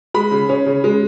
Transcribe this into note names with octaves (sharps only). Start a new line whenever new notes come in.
G#3 B5
C#3
C#4
C#3
G#3